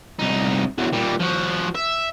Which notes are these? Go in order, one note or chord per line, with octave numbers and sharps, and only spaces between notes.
C2 D#4
E2 F#3
A#2 G3
F3 F#4
E5